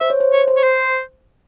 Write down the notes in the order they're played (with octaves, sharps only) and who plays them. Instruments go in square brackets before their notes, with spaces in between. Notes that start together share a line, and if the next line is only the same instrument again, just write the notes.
[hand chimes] C5 [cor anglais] E5
[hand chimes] C#5
C5
[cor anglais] C#5
[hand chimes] C5
[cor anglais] C#5
C5